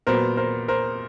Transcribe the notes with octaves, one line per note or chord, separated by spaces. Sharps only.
A#2 F#3 B3 A#4 C5
A#4 C5
A#4 C5